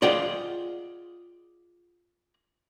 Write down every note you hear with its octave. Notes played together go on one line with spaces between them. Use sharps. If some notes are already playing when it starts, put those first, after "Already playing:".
F4 G#4 D5 D#5 F#5 G5